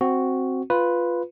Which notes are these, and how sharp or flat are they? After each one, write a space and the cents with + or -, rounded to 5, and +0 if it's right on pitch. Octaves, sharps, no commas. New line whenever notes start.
C4 +0 F#4 +0
F4 +0 B4 +0